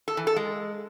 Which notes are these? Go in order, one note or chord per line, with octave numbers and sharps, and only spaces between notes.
A4
E3
A4
G#3